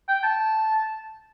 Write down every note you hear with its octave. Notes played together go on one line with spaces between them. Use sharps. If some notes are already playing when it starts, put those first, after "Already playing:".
G5
A5